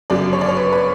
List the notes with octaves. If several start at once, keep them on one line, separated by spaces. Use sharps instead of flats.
G1 F#2 C#3 F#3 D5
C#5
D5
C#5
B4
B4